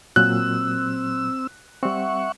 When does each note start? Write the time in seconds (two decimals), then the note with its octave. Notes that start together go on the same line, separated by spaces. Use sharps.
0.16 A#2 F#3 C4 E6 F#6
1.83 G3 C4 E5 F#5 C#6